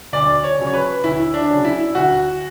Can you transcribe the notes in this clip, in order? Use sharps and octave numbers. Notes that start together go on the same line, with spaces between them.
D2 D5
C#5
C#3 F#3
C#5
B4
D2 E4
D4
C#3 F#3
E4
D2 F#4